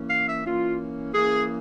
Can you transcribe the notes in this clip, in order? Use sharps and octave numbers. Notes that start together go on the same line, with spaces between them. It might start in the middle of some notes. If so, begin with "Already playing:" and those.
Already playing: E3 A#3 C#4
F5
E5
E3 A#3 C#4 F4
E3 A#3 C#4 G#4